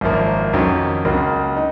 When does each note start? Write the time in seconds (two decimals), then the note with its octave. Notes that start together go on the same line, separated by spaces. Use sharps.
0.01 G#1 F#2 F3 A#3
0.53 F2 D#3 F#3 C#4
1.05 C#2 C#3 F#3 A#3
1.56 D#4